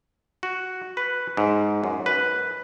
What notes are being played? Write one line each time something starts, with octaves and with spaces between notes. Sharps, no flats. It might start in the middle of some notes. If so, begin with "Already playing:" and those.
F#4
B4
G#2
F#2
B4